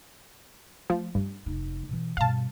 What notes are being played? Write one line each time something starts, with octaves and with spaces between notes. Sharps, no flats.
F3 A3
G2 C#4 D4
F1 D#4
B2 E3
G2 B2 F5 A5